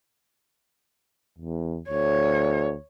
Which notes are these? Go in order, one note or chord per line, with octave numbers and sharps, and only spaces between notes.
E2
D2 C#5